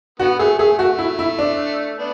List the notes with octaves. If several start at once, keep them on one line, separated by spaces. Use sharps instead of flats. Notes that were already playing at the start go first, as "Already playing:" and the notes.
D3 B3 F#4
A3 G#4
A3 G#4
A3 F#4
E4
E4
D4
B3 D4